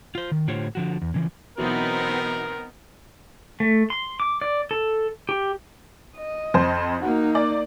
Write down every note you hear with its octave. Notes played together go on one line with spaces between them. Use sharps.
F4 C5
D#3
A2 D3 F4 G4 C5 C#5
D3 F3 F#4
E2
C#3 E3 F3
B2 E3 F#3 B3 C4 D#4 A#4
A3
C6
D6
D5
A4
G4
D#5
F2 C5
A#3 D#4 F#4
D5